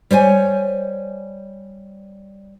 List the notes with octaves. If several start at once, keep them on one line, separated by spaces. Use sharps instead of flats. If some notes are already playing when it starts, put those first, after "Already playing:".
G3 C5 C#5 G#5